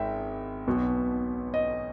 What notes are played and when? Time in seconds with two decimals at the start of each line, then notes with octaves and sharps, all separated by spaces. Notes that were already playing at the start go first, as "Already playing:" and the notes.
Already playing: G#1 G#2 E5 G5
0.67 B1 B2
1.54 D#5